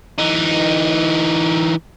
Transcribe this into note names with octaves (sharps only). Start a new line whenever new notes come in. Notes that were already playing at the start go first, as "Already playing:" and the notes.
E3 D#4